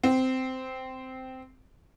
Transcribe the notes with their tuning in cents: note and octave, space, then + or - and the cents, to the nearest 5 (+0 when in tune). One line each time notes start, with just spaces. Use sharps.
C4 -10